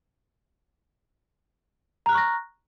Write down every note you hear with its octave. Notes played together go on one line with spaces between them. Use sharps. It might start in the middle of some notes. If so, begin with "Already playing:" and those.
A#5 C#6 F6 F#6 A#6